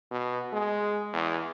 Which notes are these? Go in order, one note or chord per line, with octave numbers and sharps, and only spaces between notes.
B2
G#3
E2